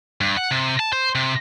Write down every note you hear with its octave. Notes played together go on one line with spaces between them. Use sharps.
G2
F#5
C3
A5
C5
C3